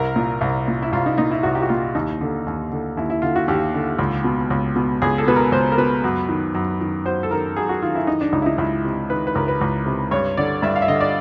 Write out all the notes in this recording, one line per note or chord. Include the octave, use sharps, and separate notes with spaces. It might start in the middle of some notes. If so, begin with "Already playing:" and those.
Already playing: C2 A#4
A#2
C2
A#2
E4
C2 F4
D#4
A#2 D#4
E4
C2 F#4
G4
F#4
A#2 F4
D#2 D#4
D3
D#2
D3
D#2 E4
E4
D3 F4
F#4
D#2 G4
D3
C#2
B2
C#2
B2
C#2 G#4
A4
B2 B4
A#4
C#2 C5
A#4
B2 B4
F#2
D#3
F#2
D#3
F#2 C5
A4
D#3 A#4
F#2 G#4
F#4
D#3 F4
E4
D#3 D#4
D4
C#2 D#4
E4
D#4
C#2 E4
C3
D#3 B4
B4
C#2 A#4
B4
C#2
C3
G2 C#5
D3 D5
G2 E5
F5
E5
D3 D#5
D5